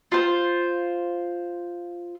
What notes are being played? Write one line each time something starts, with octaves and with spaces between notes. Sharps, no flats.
F4 C5